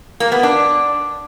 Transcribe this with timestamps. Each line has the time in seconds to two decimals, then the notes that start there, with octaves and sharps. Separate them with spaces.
0.20 A#3
0.32 B3
0.43 D4